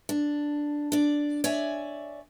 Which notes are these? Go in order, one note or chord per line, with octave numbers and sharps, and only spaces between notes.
D4
D4 D5
C#5 D5 E5 G#5